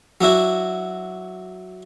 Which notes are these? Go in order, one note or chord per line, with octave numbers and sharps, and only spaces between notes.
F#3 D4 E4 F#4